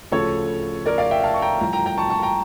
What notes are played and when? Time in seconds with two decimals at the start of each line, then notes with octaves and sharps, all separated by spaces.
0.12 D2 C#3 F3 A4 C#5
0.86 A#4 D5
0.98 D5 F5
1.11 E5 G5
1.24 F5 A5
1.34 C#6
1.42 G5 A#5
1.60 A1 G2 F3 G5 A#5
1.73 G5 A#5
1.86 G5 A#5
1.98 A5 C#6
2.10 A5 C#6
2.23 G5 A#5